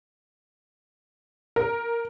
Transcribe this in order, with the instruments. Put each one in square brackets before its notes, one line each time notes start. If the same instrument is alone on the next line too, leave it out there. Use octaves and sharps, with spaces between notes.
[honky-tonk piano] A#4